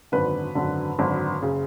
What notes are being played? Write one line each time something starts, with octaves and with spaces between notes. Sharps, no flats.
G#1 F#2 D3 B4
G#1 F#2 D3
G#1 F#2 D3
F#1 C#3